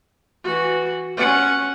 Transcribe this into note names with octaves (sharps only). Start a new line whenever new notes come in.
E3 F#4
C#4 F#5